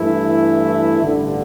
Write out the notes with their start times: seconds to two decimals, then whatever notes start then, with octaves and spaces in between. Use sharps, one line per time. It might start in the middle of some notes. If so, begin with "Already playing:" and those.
Already playing: G2 E3 A3 E4
1.00 A1 G2 D3